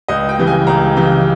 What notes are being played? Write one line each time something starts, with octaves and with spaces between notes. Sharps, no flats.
C#2 D#5
G5
C#3 E3 G3
G#5
C#2 A#5
C#3 E3 G3